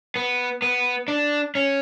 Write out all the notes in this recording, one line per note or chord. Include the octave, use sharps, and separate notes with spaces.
B3
B3
D4
C#4